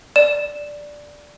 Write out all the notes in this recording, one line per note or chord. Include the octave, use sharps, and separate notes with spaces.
D5 E7